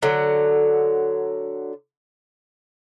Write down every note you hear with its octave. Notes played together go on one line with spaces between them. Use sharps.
D3 F#3